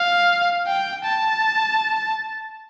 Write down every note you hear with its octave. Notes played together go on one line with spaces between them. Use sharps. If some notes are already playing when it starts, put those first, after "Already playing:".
Already playing: F5
G5
A5